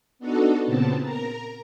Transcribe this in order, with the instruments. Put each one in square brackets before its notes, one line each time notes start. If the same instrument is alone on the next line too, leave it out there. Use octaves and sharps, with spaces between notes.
[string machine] B3 D4 D#4 F#4 A4
A#2 C#3 B3 C4 A5
A#4 A#5